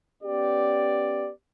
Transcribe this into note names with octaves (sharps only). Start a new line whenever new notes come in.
B3 C#4 G4 D5